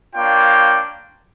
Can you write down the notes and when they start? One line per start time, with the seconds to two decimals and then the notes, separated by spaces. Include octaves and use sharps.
0.15 A#3 D4 F4 C#5 G5